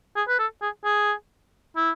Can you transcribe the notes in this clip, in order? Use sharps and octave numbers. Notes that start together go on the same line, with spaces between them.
G#4
B4
A4
G#4
G#4
E4